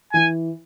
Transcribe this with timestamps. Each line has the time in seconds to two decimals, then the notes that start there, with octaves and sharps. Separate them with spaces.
0.13 E3 G#5